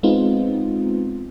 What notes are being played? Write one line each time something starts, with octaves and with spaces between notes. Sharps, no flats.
G#3 B3 C4 D#4 F4